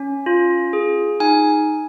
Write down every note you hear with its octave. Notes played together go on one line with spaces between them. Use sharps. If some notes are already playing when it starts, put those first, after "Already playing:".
Already playing: C#4
F4
G#4
D#4 G#5